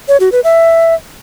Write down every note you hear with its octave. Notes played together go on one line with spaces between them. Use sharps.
C#5
F#4
B4
E5